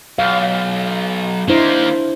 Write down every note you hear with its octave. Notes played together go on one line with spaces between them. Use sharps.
B1 F5
D#3 A#3 D4 E4 C5